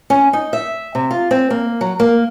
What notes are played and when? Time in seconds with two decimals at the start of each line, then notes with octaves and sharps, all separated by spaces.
0.10 C#4
0.33 D#4
0.53 E5
0.95 C3
1.11 F4
1.31 C4
1.50 A#3
1.81 F#3
2.00 A#3